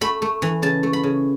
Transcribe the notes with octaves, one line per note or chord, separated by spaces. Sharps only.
A3 B5
A3
E3
C#3 A5
A3
B5
C#3